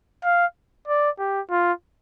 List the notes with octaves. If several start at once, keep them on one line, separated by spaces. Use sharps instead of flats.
F5
D5
G4
F4